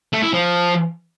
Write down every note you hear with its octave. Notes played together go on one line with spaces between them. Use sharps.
A3
E4
F3